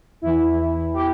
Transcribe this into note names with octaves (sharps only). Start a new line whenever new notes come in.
E2 E3 E4
G4